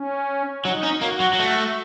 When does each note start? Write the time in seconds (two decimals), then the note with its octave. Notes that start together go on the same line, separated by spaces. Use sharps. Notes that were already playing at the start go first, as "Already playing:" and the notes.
Already playing: C#4
0.65 F#3 D#4
0.83 C#4
1.02 A#3 F#4
1.20 F#3
1.33 F#3
1.39 A3